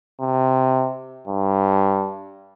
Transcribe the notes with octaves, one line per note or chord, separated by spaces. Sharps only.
C3
G2